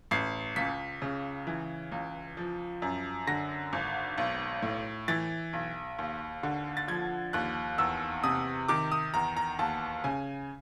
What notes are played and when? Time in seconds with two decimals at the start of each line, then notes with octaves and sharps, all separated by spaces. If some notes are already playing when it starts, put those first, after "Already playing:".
0.11 A1 C7
0.56 C#2 B6
1.02 C#3
1.47 E3
1.92 C#2
2.37 F3
2.82 F#2
3.27 D3 A#6
3.73 G#1
4.18 B1
4.62 A2
5.08 E3 A6
5.53 B1
5.99 D#2
6.43 D3
6.77 A6
6.88 F3 G#6
7.33 D#2 F#6
7.78 E2 E6
8.24 C3 D#6
8.68 D#3 D6
8.92 D#6
9.14 E2 A#5
9.37 A#5
9.59 D#2 A5
10.04 C#3 G#5